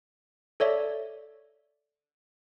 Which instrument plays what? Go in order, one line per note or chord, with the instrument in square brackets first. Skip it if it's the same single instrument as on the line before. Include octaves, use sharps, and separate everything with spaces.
[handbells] A4 C#5 D5 E5